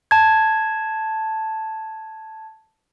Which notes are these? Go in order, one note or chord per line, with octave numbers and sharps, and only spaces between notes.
A5 G#6